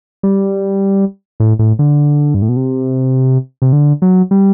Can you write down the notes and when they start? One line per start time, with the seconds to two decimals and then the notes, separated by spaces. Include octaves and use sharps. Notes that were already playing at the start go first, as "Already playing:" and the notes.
0.23 G3
1.40 A2
1.59 A2
1.79 D3
2.34 G2
2.42 A2
2.49 B2
2.56 C3
3.62 C3
3.73 D3
4.02 F#3
4.31 G3